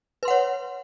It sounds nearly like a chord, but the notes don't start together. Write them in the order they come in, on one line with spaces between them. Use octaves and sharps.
B4 C6 F#5 C#5